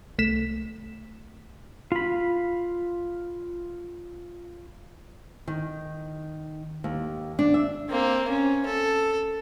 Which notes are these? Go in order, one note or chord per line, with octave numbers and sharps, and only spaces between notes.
C2 A3 B6 E7
F4 B5
D#3
D#2
D4
E5
A#3 C4
C#4
A4